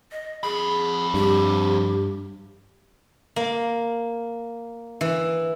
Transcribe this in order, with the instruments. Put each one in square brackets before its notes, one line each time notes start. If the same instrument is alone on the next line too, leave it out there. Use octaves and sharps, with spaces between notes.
[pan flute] D#5
[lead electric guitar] F2 B5 [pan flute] G#4
[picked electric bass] G2 [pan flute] G4
[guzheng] A#3
E3